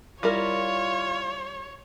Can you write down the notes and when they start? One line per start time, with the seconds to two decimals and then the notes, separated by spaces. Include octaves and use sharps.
0.23 G3 E4 F4 A#4 C#5